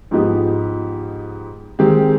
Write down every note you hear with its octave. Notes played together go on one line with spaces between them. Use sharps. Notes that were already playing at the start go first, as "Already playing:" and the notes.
G#2 F3 B3 D#4 G4
D#3 G#3 C4 G4